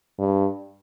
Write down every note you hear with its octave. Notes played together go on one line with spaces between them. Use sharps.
G2